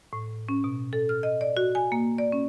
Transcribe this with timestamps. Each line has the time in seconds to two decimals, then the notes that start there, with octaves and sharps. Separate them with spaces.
0.13 A2
0.49 C#4
0.64 B2
0.93 A4
1.09 F6
1.23 D#5
1.41 D5
1.57 F#4
1.75 G#5
1.92 A#3
2.18 D5
2.32 C#4